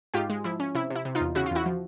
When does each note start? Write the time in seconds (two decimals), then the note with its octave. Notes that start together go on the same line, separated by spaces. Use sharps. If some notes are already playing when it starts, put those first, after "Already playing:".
0.14 G#2 F4 G4
0.29 G#3
0.44 F3 E4
0.60 C#4
0.75 C3 E4
0.90 C3
0.95 E4
1.05 C3
1.15 D#4 F4
1.21 E2
1.35 C#3 E4 F#4
1.46 F4
1.51 E2 E4 F#4
1.66 F3